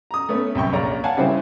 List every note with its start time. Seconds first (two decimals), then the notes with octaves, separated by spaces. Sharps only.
0.11 A#5 D#6
0.29 A3 B3 C#4
0.55 C2 F#2 G5 C#6
0.73 A#1 A#3 C#5 D5 A#5
1.04 C#5 F5 F#5 G#5 A5
1.17 C#3 E3 G3 C4 E4 C5